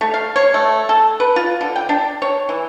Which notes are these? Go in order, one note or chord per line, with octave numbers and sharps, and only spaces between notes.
A3
F5
C#5
A3
A4
B4
F4
D3
G5
D4
C#5
E3